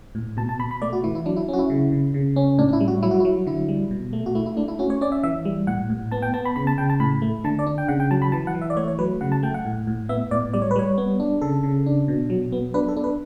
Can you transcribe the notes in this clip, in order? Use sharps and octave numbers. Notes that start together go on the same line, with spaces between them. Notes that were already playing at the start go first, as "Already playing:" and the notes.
A2
B2 A5
A5
B2 B5
B5
A3 D5
F#4
E3 E4
E4
F#3 D4
E4
C#4 F#4
E4
C#3
C#3
C#3
C#4
A2 D4
D4
E4
G3
F#4
F#3 E4
F#4
E4
F#3
D3 E4
G3
B2
A3
F#4
A3 E4
E4
A3 D4
E4
C#4 F#4
C#5
C#4 D5
E5
E3 E5
G3
A2 F#5
A2
B3 A5
G5
B3 A5
B5
C#3 B5
A5
C#3 G5
A5
A2 B5
A3
D3 A5
D5
D4
G5
C#3 F#5
G5
F#3 A5
B5
E3 A5
F#5
E3
E5
D5
A3 C#5
C#5
F#3 B4
C#3 F#5
A5
A3 G5
F#5
A2
A2
B3 E5
A2 D5
G3 D5
C#5
B4
G3 C#5
B3
D4
C#3 A4
C#3
D4
B2
F#3
B3
D4 B4
A4
D4
B4